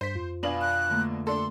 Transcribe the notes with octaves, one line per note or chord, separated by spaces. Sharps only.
G2 C5 B6
F2 F4
B2 D4 B4 F5 G#5 F#7
F#6
D3 A3 A#3
D4 A4 C6